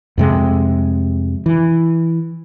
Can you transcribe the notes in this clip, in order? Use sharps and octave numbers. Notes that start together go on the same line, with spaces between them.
F2 C3 G#3
E3